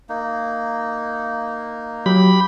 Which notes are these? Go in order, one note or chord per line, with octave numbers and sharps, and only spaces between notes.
A#3 D#4
F#3 G4 B5